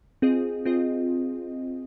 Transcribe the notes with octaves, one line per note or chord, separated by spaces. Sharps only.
C4 F4 G#4 D#5
C4 F4 G#4 D#5